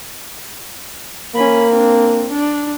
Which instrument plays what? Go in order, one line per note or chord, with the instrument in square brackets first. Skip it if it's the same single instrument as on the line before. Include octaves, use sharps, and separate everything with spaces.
[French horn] A#3 [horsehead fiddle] C#4 B5
[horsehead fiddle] C4 D4
D4